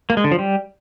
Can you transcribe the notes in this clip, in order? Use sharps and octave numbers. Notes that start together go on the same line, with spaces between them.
A#3
G#3
D3
F3
G3